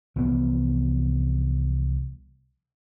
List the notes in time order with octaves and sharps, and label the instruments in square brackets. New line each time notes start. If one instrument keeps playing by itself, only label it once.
[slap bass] C2 E3 F3 B3